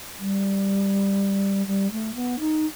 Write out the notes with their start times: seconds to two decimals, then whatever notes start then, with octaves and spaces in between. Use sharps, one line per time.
0.18 G3
1.66 G3
1.91 A3
2.15 B3
2.39 D#4